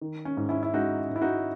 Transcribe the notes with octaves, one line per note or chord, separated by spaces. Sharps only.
D#3
C#4
G#2
C#4 E4
E4
G#3 D#4 F#4
G#2
E4
D#4 F#4